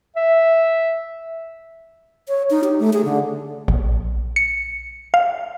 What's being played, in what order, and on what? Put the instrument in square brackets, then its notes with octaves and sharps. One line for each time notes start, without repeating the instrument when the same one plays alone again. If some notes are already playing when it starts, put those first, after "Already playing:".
[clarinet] E5
[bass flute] C#5
D#4
G4
A3
G#4
D3
[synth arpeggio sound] A#1
C#7
F5